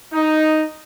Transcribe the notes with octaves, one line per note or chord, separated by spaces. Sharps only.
D#4